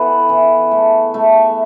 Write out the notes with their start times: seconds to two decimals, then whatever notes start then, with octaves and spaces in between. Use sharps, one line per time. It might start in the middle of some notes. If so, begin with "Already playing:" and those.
Already playing: E3 B3 A4
0.29 E3
0.71 A3
1.14 A3